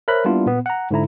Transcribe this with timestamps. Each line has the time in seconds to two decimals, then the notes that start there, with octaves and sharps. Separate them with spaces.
0.08 A#4 C5 C#5 E5 B5 F#6
0.25 G3 A#3 B3 D4 E4 F4
0.46 A#2 B3
0.66 F#5 A#5
0.91 G#2 D3 E4 A#5